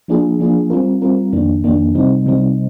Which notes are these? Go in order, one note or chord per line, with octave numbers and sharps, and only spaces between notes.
F3 A#3 D4 F4 G#4
F3 A#3 D4 F4 G#4
G3 C4 F4 A#4
G3 C4 F4 A#4
F2 D#3 A#3 D4
F2 D#3 A#3 D4
C3 G3 C4 D#4
C3 G3 C4 D#4